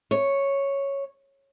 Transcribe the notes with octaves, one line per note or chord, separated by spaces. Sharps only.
C#5